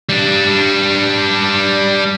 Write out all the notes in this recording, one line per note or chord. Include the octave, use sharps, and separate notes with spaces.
G3 D4